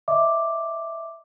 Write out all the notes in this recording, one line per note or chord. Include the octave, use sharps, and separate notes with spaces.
D#5 E5 D6